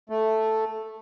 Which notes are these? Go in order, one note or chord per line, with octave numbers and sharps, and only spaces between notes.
A3